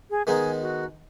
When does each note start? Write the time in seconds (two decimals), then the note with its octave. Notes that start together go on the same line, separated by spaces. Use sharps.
0.10 G#4
0.27 D#3 G#3 B3 D#4 G#4
0.61 F#4